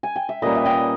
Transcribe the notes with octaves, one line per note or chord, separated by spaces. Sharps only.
G#5
G5
E5
A#2 G3 A#3 C#4 B4 D#5
E5
D#5 G5